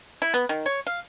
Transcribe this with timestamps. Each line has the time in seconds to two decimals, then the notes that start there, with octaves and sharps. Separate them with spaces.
0.22 E4
0.34 B3
0.49 D#3
0.66 C#5
0.87 F5